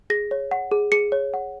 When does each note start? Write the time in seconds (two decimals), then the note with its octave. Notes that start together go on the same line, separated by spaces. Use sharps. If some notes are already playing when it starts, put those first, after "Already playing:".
0.10 G#4 A#6
0.31 C#5
0.51 F#5
0.71 G#4
0.92 G#4 C#7
1.12 C#5
1.34 F#5